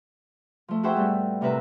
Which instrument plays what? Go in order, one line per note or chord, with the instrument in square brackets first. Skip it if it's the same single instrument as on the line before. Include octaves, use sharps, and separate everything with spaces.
[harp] F3 A3
F#4 G#4 C5 E5 G5 B5
A2 G3 A3 B3
A2 C3 A#4 B4 E5